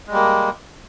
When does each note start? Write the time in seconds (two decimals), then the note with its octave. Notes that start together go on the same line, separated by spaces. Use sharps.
0.07 G#3
0.11 G3
0.14 A#3